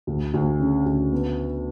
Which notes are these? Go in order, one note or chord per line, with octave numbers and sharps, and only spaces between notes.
D2
D2
C#3
D2
B3